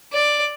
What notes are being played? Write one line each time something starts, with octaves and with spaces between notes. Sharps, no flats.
D5